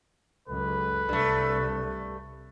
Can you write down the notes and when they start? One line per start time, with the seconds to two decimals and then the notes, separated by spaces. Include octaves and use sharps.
0.48 C#2 F#2 A4 B4
1.09 C2 G2 A3